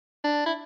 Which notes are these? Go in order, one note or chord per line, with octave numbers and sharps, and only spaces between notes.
D4
E4